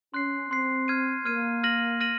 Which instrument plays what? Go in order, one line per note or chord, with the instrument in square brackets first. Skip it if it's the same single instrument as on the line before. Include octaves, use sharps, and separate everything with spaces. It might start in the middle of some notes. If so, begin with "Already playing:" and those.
[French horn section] C#4 [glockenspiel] C6 F#6 C7
[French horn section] C4 [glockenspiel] C6 F#6 C7
[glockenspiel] F6 G#6 D#7
[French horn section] A#3 [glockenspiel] F6 G#6 D#7
[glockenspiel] F6 A#6 D#7 F#7
F6 A#6 D#7 F#7